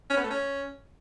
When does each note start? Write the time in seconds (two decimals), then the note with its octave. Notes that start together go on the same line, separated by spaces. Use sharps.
0.10 C#4
0.17 B3
0.24 A3
0.31 C#4